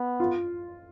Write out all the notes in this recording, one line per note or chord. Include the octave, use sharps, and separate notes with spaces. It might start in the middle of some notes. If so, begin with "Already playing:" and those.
Already playing: B3
F4